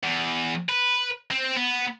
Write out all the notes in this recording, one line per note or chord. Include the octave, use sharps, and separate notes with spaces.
E2
B4
C4
B3